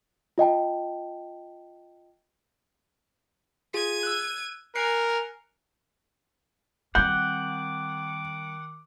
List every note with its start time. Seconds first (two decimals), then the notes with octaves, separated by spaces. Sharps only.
0.38 F4 D#5 G5 A5
3.74 F4 G#4 G#6 D#7
4.03 E6 F#6
4.76 A#4 G#5 F#6 C7 C#7
6.95 D#3 G3 C4 F#5 D6 G6